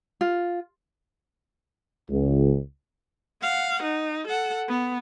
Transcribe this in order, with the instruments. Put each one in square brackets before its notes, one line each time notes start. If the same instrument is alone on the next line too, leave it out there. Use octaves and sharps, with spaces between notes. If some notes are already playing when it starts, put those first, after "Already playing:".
[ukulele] F4
[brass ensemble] C#2
[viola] F5 F#5
D#4
A4 F#5
B3